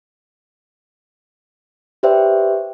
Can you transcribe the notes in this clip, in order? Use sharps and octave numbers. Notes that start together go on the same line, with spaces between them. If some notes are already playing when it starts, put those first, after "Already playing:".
G4 B4 C5 D5 E5 G5